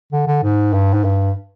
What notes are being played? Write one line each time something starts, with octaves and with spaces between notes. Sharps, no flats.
D3
D3
G#2
G2
G#2
G2